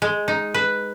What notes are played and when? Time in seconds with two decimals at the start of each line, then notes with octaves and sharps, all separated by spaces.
0.02 G#3
0.28 D#4
0.54 B4